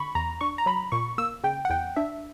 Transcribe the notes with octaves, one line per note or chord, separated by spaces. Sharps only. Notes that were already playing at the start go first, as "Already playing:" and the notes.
Already playing: D3 B5 C#6
E2 A#5
D4 C#6
A#5
F#3 B5
A#2 C#6
A#3 E6
C#3 G5
F#5
E2 G5
D4 E5